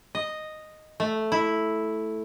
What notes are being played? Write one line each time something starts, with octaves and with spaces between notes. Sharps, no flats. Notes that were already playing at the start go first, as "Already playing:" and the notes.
D#5
A3
E4